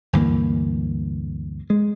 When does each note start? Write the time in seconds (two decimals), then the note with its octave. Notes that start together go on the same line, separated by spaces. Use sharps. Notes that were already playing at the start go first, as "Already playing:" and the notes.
0.13 D2 G2 E3 A#3
1.70 G#3